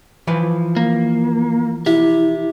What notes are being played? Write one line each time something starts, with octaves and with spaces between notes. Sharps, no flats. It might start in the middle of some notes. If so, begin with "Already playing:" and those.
E3 F3 B4
A#3
E4 G4 E5